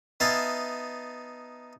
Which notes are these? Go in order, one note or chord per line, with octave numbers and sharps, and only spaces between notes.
B3 D#4 E5 F5 G#5 A5